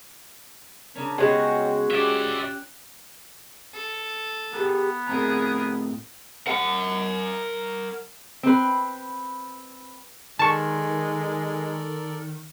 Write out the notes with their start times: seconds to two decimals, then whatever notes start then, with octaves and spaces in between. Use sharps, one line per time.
0.96 C#3 C#4 D4 A#4
1.18 C#3 G#3 B3 C#4 F#4 F#5 G5
1.91 C#4 F4 G4 D5 E5 F#6
3.74 A4
4.53 B3 G4 G#4 A#4
5.07 A2 C4 G#4 A#4 A#5
6.47 A#4 F#5
8.43 C4 B4
10.39 D#3 G#3 A4 A#4 D5 A5 C#6